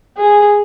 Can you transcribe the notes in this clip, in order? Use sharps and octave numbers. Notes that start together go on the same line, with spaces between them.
G#4